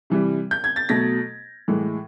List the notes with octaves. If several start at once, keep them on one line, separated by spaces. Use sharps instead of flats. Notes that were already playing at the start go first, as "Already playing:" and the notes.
C3 E3 G3
G6
G#6
A6
B2 F#3 A3 A#6
A2 E3 G#3